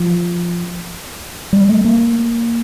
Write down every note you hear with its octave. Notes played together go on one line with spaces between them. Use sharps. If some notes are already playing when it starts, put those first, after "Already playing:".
Already playing: F3
G3
A3
A#3